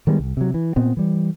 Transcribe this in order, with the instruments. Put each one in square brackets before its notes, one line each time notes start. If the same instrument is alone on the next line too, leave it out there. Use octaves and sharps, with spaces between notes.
[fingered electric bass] D#3 G3 G#3 B3
C2
C3 F#3
E3
A#2 B3 C4
E3 G3